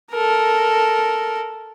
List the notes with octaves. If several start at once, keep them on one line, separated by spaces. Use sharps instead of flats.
A4 A#4